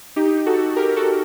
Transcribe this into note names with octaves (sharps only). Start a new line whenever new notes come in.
D#4 G4
F#4 A4
G4 A#4
F#4 A4